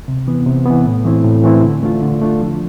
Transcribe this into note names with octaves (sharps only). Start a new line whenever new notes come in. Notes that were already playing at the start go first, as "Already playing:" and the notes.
C3
E3 B3
C3
E3 B3
A2
E3 A3 C4 E4
A2
E3 A3 C4 E4
D3
A3 D4 F4
D3
A3 D4 F4
F3